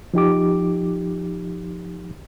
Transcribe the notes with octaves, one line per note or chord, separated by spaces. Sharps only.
F3 D#4 G4 D6